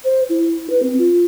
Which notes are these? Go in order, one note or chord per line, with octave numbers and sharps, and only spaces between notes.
C5
E4
B4
C4
F4